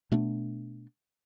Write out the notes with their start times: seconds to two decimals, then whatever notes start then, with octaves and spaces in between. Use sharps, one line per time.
0.12 B2 A3 B3 D4